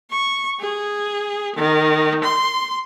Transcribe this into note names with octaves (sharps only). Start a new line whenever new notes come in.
C#6
G#4
D#3
C6